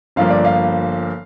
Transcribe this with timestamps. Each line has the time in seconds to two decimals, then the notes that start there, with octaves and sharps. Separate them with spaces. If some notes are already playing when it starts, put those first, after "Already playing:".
0.16 G1 G2 F3 A#3 F5
0.30 D5
0.45 F5